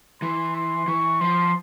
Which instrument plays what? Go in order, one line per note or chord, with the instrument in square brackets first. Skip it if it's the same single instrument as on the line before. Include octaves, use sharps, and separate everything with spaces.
[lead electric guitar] E3 [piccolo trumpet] C6
[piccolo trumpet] C6
[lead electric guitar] E3 [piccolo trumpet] C#6
[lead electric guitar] F3 [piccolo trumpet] C6